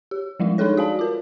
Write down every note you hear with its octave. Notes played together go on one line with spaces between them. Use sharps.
G4
F3 G3 G#3 E4
D4 D#4 G#4 A4 C#5
F#4 D5 F5 A5
F4 A#4